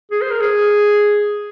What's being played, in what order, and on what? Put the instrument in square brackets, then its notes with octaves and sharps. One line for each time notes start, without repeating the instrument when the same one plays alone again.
[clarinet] G#4
C5
A#4
G#4